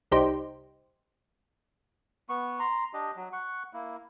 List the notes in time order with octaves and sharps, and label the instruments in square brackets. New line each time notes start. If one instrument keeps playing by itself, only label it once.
[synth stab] C2 G3 D#4 G4 C5
[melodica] B3 C#6
A#5 C6
D4 G4 D#5
F#3
F#5 C#6
A#3 E4